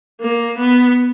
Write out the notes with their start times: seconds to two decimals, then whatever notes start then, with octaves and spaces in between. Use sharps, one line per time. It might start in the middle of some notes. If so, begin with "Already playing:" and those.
0.21 A#3
0.57 B3